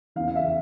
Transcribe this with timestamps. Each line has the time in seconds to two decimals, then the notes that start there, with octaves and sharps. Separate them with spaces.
0.16 E2 C#3 E3 F5
0.28 F5
0.36 E5